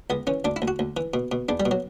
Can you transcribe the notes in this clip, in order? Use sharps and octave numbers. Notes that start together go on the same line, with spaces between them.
C#2 B3
E3 C#4
D2 D4
E4
D2
F#4
D2
E3
B2
B2
E2 D4
G3
B2
F#3